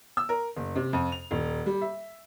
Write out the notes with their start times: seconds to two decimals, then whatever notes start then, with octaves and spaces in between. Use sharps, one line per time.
0.17 E6
0.29 A#4
0.56 F#1
0.76 C3
0.93 F2
1.12 F7
1.31 D#1
1.66 G3
1.81 E5